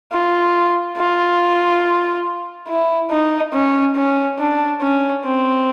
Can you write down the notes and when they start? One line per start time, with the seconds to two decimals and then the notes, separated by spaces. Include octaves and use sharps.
0.12 F4
0.97 F4
2.68 E4
3.11 D#4
3.53 C#4
3.96 C#4
4.38 D4
4.81 C#4
5.24 C4